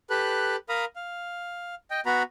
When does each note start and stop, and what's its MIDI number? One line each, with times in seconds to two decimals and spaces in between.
0.10 0.56 67
0.10 0.56 69
0.10 0.56 71
0.10 0.56 90
0.69 0.85 70
0.69 0.85 77
0.69 0.85 82
0.69 0.85 83
0.69 0.85 87
0.96 1.75 77
1.91 2.01 75
1.91 2.01 79
2.06 2.23 59
2.06 2.23 66
2.06 2.23 82
2.06 2.23 83